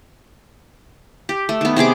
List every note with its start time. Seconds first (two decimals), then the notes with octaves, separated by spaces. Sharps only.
1.29 G4
1.49 A3
1.61 D#3 B3
1.76 C3 B3 G#4 D6